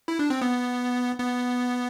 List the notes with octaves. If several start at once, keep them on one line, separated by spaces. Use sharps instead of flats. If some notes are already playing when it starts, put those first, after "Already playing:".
E4
D4
C4
B3
B3